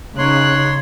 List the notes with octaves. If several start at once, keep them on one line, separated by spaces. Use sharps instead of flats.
C#3 D#4 C#5 C6 F#6